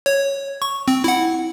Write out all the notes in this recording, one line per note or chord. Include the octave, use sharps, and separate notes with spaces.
C#5
C#6
C4
E4 F#5